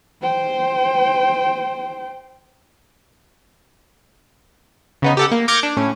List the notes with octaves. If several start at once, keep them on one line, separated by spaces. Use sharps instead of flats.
C5 G5
C#3 B3 D#4
G4 A4 F#5
A#3
D6 F6 G6 G#6 A#6 C#7
D4
A2 C#4